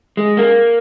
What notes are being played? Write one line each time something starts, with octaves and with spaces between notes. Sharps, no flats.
G#3
A#3